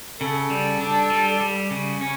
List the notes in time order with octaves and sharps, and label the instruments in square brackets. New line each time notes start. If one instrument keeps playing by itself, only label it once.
[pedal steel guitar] C#3 [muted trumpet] A4
[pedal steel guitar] G3
D4
G3
G3
C#3
C#4